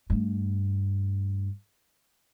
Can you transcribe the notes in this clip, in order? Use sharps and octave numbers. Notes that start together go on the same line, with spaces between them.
G2 A3